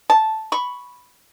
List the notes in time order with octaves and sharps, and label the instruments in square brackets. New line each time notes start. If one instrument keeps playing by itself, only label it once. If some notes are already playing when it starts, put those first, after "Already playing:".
[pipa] A5
B5 C#6